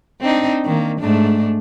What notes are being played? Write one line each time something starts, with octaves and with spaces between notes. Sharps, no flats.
C4 D4 D#4
D#3 A#3
G#2 A3 D4